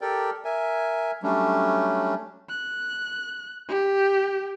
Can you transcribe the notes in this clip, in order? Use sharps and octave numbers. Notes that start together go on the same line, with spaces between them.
G4 A4 A#4 D5 G5
A#4 E5 G#5
F#3 G3 A3 C#4 D4
F#6
G4